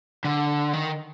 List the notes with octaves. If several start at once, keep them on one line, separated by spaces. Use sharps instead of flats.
D3
D#3